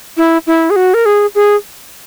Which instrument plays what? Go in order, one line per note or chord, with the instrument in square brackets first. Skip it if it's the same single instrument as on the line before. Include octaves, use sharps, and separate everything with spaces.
[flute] E4
E4
G#4
F#4
A#4
G#4
G#4